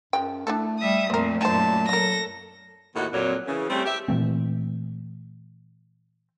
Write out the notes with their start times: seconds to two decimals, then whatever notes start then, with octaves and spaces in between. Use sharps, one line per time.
0.13 F#2 F3 G#3 G5
0.47 A3 D4 E4 A4
0.78 G3 E5 D#6
1.10 F2 A#2 A3 C4 A#4
1.41 F#2 A#2 D#4 C5 A5
1.89 F#3 F4 A4 A#4 A#6
2.95 D#2 A2 D#3 D#4 F#4 F#5
3.12 F2 A#2 F#3
3.47 C#3 E3
3.68 G3 A3 C4 C#4 G4
3.85 G4 E5
4.08 A#2 E3 A3 C4